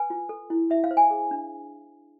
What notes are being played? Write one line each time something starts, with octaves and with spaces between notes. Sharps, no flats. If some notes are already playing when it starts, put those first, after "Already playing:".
Already playing: B4 G#5
F4
A4
E4
E4 E5
F5
C5
G#5
G#4
D4